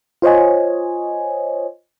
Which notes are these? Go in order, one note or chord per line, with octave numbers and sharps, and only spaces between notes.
F4 C5 C#5 D#5 G#5